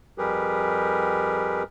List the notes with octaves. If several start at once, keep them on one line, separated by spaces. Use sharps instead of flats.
F2 G3 G4 G#4 A#4 B4